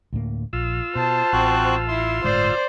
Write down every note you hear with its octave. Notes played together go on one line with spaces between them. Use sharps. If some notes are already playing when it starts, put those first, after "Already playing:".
D2 A2 A#3
A#1 F4 E6
B2 C5 A5
A1 C4 F#4 F#6
E4 C6
G1 A2 G#3 C5 D5